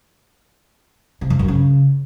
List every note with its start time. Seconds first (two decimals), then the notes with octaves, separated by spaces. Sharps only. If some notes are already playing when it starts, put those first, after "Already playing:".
1.21 C3
1.30 F2
1.39 F#2
1.48 C#3